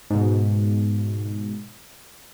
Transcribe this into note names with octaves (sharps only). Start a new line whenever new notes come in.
G#2 B2